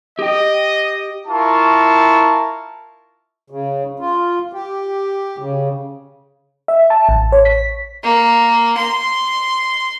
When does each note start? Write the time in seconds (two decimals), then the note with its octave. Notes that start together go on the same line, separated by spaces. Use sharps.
0.19 G4 D#5 G5
1.28 E4 F4 A#4 A5 C#6
3.50 C#3
4.00 F4
4.53 G4
5.38 C#3
6.68 E5
6.90 A5
7.09 A1
7.32 C#5
7.45 B6
8.04 A#3
8.77 C6